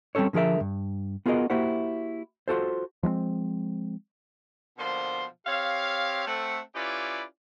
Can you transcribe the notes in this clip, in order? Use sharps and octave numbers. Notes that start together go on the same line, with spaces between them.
G3 C4 C#4 A4 C#5
D3 F3 G#4 A#4 E5
G2
B3 F4 F#4 G#4 A#4 D#5
A#3 E4 F#4 G4 C5 F#5
F4 F#4 A4 C5
F3 G#3 A#3 C4
B2 D3 F3 A#3 C5 C6
C4 G4 C#5 F5
A3 C4 F#5
C#4 E4 F4 G4 B4 D5